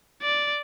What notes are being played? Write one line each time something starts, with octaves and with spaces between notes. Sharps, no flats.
D5